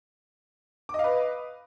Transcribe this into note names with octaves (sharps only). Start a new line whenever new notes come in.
B4 D#5 F5 D6